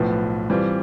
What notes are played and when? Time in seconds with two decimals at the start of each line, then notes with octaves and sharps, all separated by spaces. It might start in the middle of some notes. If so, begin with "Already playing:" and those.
Already playing: B1 A2 F3 B3
0.50 E3 G3 C4 F4